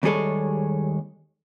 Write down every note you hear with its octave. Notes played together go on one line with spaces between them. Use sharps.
D#2 G3 G#3 G#4 A4 C#5